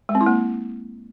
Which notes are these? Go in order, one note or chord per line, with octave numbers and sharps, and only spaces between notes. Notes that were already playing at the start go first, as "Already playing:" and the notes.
G#3
C4
E4
A#3